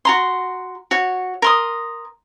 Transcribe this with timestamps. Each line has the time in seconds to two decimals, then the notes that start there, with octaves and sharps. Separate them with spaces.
0.05 F#4 A#5 C6
0.91 F#4 C#5
1.42 A#4 C6 D#6